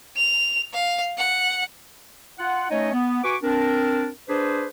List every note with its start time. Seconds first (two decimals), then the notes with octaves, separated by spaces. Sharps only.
0.17 F7
0.73 F5
1.18 F#5
2.39 F4 F#5
2.71 A3 C#4 D#4 C#5 D#5
2.93 B3
3.24 F#4 B4 G#5 C#6 D6
3.43 C4 D4 A#4
4.29 D4 G#4 B4 C5